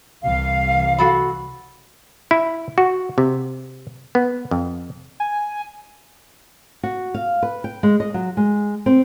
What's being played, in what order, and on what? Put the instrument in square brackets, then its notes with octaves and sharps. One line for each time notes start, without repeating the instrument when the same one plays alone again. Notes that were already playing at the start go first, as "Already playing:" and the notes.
[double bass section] C2 C3 E3 [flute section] F5
[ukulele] F#4 A4 B5
[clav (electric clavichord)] E4
F#4
C3
B3
F2
[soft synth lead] G#5
[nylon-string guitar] F#4
F5
B4
G5
G#3
D#5
F#3
G#3
C4